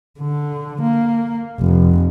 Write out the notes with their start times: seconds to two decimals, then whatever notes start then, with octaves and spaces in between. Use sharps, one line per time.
0.19 D3
0.82 A#3
1.60 F1